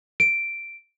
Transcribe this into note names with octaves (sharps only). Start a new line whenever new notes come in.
D7